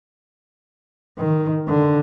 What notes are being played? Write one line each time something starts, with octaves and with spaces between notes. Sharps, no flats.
D#3
D3